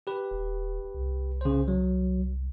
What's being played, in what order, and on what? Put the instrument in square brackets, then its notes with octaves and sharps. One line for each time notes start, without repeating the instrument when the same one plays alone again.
[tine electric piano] G4 B4
[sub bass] D#1
C2
[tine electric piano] C#3 C5
F#3